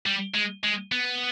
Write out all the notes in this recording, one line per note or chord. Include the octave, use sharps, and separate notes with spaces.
G3
G#3
G#3
B3